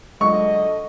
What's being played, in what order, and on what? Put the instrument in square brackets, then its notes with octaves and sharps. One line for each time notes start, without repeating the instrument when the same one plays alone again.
[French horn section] D3 A4 D#5 [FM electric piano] F#3 G#3 [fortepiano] C#6